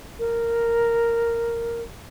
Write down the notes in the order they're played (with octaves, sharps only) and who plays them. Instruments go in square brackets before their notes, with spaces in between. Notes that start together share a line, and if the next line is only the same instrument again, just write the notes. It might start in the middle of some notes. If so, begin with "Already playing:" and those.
[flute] A#4